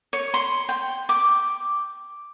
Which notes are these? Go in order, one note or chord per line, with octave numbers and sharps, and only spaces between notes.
C#5
C6
G5
D6